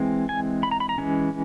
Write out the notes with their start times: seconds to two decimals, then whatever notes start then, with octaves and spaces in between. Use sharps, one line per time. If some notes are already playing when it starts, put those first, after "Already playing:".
Already playing: E3 G#3 C4
0.29 G#5
0.63 B5
0.71 A#5
0.80 B5
0.89 A#5
0.98 E3 G#3 C#4